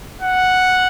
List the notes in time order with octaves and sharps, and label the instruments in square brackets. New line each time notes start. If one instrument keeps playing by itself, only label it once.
[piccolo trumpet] F#5